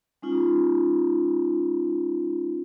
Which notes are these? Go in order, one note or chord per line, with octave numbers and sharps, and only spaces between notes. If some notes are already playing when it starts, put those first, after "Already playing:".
G#3 C#4 D#4 F4